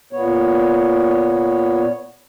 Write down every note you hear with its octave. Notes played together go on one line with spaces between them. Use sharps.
A#2 B3 C#5